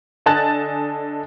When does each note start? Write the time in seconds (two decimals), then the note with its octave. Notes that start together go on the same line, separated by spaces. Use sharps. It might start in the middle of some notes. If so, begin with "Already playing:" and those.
0.26 D3 D#5 G#5 A5 F#6 A6